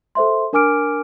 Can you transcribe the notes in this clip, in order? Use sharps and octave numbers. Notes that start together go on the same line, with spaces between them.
A4 C5 E5 C6
D4 A#4 G#5 D6 F6 D7